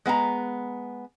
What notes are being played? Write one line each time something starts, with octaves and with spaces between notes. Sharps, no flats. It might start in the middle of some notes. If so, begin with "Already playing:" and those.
G#3 B3 F5 A#5